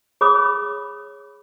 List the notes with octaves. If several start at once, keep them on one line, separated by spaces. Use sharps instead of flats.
G#4 C#5 B5 D6 D#6